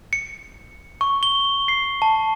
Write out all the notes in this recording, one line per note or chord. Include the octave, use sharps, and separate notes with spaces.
C#7
C#6
G7
C7
A5